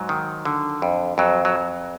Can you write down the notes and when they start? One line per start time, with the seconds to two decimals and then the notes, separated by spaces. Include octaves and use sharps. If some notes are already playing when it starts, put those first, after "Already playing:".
Already playing: G#2 F#3
0.09 D#3
0.45 D3
0.82 F2
1.18 F2 F#3
1.45 F#3